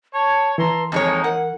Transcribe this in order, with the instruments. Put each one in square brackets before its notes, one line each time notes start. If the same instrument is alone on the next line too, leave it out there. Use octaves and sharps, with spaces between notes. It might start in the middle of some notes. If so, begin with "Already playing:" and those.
[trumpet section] C#5 [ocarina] A5
[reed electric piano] E3 [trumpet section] A4 A#5 C6 [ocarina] B4
[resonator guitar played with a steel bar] F2 G#3 C#5 [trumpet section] A#3 D#4 [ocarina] A5
[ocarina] A#4 [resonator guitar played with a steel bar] F#5